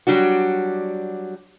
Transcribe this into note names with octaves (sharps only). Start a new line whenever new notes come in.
F#3 G3 D4 F#4